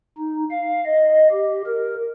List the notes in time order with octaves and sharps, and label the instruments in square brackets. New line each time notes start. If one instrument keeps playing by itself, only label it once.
[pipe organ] D#4
F5
D#5
G4
A#4